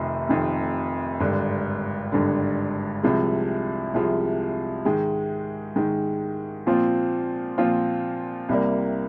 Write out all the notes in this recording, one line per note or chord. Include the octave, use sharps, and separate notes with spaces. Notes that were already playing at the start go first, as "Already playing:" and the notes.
Already playing: F1 F2 C3 D#3
F1 F2 C3 D#3
G#1 G2 D3
G#1 G2 D3
C2 C3 F3 G#3
C2 C3 F3 G#3
G#2 D#3 G#3
G#2 D#3 G#3
A#2 F3 C4 F4
A#2 F3 C4 F4
C2 C3 G3 A#3